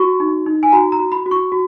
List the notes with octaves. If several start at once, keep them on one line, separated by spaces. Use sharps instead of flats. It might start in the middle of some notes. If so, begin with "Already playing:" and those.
Already playing: F#4 C#6
D#4
D#4
G#5
F#4 A#5
A#5
F#4
B5
F#4
C#6
F#4